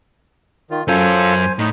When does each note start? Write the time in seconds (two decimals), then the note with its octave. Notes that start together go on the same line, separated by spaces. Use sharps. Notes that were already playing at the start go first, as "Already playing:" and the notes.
0.71 D#3 F4
0.88 F#2 C#4 F4 A4 C5 G#5
1.59 A2 D#4